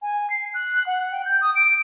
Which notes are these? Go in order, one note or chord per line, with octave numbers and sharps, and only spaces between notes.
G#5
C7
F#6
F#5
G5
G6
D#6
D7